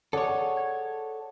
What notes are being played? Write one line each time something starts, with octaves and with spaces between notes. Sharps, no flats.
G#4 A4 C#5 D5 F#5
G#6